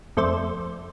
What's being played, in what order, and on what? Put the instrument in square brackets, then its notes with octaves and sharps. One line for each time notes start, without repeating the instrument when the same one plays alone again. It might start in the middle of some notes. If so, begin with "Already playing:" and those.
[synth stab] F2 A3 C5 D5